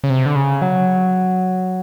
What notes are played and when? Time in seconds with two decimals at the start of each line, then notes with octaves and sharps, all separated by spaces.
0.04 C#3
0.10 C3
0.26 D3
0.35 C#3
0.62 F#3